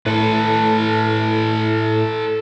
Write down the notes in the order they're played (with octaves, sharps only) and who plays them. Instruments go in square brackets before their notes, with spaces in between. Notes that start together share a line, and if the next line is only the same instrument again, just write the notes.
[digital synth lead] A2 [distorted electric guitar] A4 B4